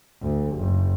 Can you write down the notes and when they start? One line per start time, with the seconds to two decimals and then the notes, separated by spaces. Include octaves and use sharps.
0.22 D2
0.56 F#1